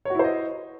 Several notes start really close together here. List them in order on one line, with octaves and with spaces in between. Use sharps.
C#5 F#4 E4 C5 D#5